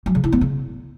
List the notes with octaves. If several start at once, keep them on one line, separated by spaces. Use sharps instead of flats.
F#3
C#3
E4
B3
C#3